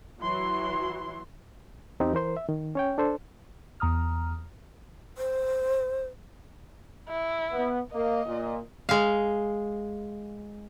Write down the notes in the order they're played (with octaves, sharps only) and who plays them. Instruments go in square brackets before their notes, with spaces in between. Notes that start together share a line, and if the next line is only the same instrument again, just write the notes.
[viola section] E3 F#3 E4 F#4 C6
[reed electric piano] E2 C4 D#4 G4
E3 A#4 C5 C6
E5
D#3
C#4 C#5 G5
D4 A4 C5
[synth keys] E2 A#5 D#6 F6
[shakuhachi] C5
[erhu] E4
[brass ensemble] B3
[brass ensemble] A#3 [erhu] D#5
[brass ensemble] A#2
[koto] G#3 F5